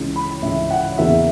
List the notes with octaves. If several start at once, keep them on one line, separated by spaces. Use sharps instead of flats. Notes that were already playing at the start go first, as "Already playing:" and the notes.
Already playing: C#2 C#3 E3
B5
C#2 C#3 E3 E5
F#5
E2 C#3 E3 A#3 E5